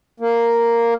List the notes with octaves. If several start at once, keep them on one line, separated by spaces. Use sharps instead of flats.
A#3